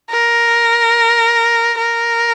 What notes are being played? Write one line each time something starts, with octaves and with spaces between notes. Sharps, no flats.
A#4
A#4